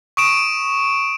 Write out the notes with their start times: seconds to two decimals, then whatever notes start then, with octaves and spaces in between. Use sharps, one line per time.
0.17 C#6 D#6 D7 E7